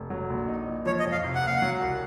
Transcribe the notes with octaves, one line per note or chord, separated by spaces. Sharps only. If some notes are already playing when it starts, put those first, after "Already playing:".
Already playing: F1
F#3
A#1
D#4
A#2
F3 C#5
D#5
F2
F5
C3
F#5
F#1 F5
F#5
F#3
C2